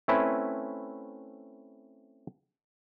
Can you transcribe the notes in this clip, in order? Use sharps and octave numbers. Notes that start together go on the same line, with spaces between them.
A3 C4 C#4 E4 B4